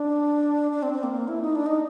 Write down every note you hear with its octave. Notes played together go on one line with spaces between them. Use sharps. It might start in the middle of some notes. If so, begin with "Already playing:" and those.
Already playing: D4
D4
C4
C4
A#3
A#3
E4
D#4
D4
D#4